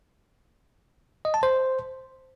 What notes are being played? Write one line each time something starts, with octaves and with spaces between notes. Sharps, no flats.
D#5
A5
C5